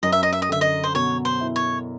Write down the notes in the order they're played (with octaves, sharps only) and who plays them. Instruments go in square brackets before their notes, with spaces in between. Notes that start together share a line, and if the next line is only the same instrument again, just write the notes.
[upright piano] F#2 [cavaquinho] D#5
[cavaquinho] E5
D#5
E5
D#5
[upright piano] D3 [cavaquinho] E5
[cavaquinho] D#5
C5
[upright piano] B2 [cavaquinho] C#5
[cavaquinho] C5
[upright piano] E4
[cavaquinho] C#5